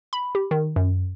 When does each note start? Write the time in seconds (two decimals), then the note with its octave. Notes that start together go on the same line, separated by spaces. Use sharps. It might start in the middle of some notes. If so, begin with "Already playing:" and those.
0.13 B5
0.35 G4
0.51 D#3
0.76 F#2